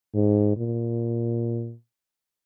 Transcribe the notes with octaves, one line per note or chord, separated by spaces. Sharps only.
G#2
A#2